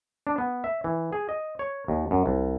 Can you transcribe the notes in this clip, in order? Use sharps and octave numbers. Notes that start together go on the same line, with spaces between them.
D4
B3
E5
E3
G#4
D#5
C#5
D#2
F#2
C2